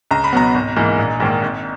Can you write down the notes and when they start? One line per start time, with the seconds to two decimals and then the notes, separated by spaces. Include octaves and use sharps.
0.11 C#2 A#5
0.24 B5
0.33 B2 F#3 B3 A#5
0.55 G#1
0.76 G#2 E3 A#3
0.98 A#1
1.20 G#2 D#3 A#3
1.42 G#1